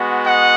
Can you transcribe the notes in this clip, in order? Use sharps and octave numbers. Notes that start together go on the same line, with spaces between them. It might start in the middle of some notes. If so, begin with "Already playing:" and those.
Already playing: G#3 B3 F#4
D#5 F#5